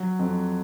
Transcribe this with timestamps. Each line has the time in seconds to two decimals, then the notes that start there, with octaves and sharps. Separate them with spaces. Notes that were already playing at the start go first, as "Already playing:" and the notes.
Already playing: F#3
0.19 F2